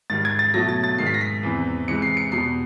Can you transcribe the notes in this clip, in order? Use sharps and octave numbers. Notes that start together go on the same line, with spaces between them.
G#2 D#3 G3 A6
G#6
A6
B2 F#3 A3 A#6
A6
A6
G#2 D#3 G#3 C7
B6
A#6
B6
E2 C3 E3
C3 E3 G#3 C#7
C7
C#7
E2 B2 G3 C7